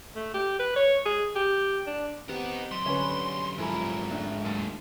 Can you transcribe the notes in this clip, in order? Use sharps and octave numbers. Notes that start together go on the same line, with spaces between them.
A3
G4
B4
C#5
G#4
G4
D4
B3 C4 G4 A#4 B4 D#5
F#2 G3 C6
D3 C#4 B4 C#5 G#5 B5
G#2 F3 E4 A4 A#4 G#5 B5
F1 G#3 A3 D4
D#2 F#3 G#4 A6